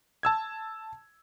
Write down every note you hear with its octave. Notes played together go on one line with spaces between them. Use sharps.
A5 E6 G#6